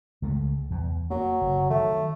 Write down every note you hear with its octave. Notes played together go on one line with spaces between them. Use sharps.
C#2 G#3 A3
E2
F#3 A#3
F#1
D#3 F#3 A3